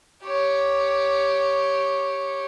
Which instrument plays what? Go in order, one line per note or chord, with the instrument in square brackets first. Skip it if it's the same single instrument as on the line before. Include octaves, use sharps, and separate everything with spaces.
[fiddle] G4 C#5